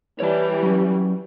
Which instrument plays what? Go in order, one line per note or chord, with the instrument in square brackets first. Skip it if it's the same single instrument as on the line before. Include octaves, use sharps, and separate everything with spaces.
[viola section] E3 G3 [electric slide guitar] C#5 D5 A5
[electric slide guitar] F#3 C#4